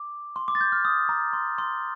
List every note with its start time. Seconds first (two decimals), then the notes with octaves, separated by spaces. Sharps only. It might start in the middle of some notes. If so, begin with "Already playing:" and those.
Already playing: D6
0.36 C6
0.48 D6
0.55 A6
0.61 G6
0.72 F6
0.85 D#6
1.09 A#5
1.33 C6
1.58 C6